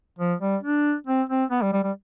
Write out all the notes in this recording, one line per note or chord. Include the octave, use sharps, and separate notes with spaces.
F3
G3
D4
C4
C4
B3
G3
G3
G3